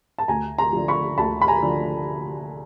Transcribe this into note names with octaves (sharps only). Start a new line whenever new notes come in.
A5
D2 G#5 A#5
A#5 C6
D3 F3
B5 C#6
D2 A5 B5
B5
G#5 A#5
D3 F3